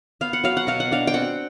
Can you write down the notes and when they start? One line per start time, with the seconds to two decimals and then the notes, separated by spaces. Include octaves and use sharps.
0.21 B3 F5
0.33 F#5
0.44 F#3 F5
0.57 F#5
0.67 B2 F5
0.80 F#5
0.91 D4 F5
1.07 G5
1.14 C4 F#5